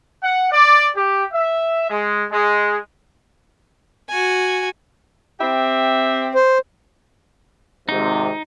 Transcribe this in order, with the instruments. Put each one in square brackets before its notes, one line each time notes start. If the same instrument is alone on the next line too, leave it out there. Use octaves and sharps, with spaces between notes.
[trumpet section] F#5
D5
G4
E5
G#3
G#3
[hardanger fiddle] F#4 G#5
[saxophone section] C4 G4 E5
[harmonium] C5
[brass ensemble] G#1 G#2 C3 [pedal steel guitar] D#4